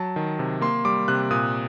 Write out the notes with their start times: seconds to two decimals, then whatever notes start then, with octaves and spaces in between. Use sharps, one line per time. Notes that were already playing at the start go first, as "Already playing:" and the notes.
Already playing: F#3 A5
0.16 D#3
0.39 C3
0.61 A#3 C6
0.85 G3 D6
1.08 C3 F#6
1.31 A#2 D#6